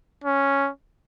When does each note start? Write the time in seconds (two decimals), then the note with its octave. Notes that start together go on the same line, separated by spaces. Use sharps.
0.24 C#4